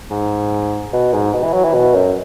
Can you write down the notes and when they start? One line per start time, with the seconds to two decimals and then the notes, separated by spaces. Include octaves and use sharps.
0.11 G#2
0.93 B2
1.13 G#2
1.33 B2
1.43 E3
1.53 F#3
1.64 E3
1.74 B2
1.94 F#2